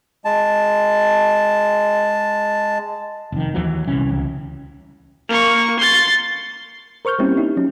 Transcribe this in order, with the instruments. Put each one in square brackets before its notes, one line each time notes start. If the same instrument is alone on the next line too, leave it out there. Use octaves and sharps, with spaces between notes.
[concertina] G#3 A5
[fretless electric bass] F1 D#3
D#2 E3 F#3
D#1 C2 E3 C#4
C#2
[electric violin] A#3 C#6
C6 A6
[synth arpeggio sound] A#4 C5 C#6 F6 G6
G3 A#3 C4 C#4 E4 G4
D#4 E4 G4
F#3 C#4